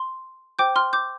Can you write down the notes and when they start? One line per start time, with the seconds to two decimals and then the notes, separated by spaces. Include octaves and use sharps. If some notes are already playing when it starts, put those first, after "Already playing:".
Already playing: C6
0.59 C5 G5 D6 G6
0.76 C6 F6
0.93 D6 G6